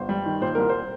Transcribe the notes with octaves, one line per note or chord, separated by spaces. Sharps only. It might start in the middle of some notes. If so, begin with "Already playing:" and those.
Already playing: G1 C5
G3
D#3
A#2 C5
C2 A#4
C5